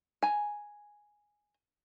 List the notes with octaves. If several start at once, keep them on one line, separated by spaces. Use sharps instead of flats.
G#5 A#5